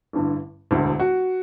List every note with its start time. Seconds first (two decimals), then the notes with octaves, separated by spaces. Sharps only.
0.13 A1 G2 D3
0.71 E1 D2 D3
0.99 F#4